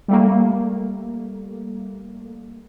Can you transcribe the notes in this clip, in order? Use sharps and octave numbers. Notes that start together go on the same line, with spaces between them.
G3 A3 A#3